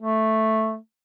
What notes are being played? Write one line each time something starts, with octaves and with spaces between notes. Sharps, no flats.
A3